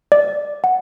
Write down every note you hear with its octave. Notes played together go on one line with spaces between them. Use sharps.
D5
F#5